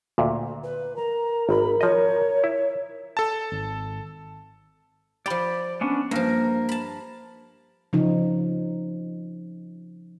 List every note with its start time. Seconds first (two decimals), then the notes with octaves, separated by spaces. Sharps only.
0.18 D2 A#2
0.63 B4
0.96 A#4 A#5
1.49 G#1 B5
1.81 F3 C#5 D#5
2.44 E4
3.17 A4 A5
3.52 G#1
5.26 F3 G4 D5 B5
5.81 B3 C#4 D4
6.11 G2 F3 A#3 A#4
6.69 A5 B5
7.93 C#3 F3 D#4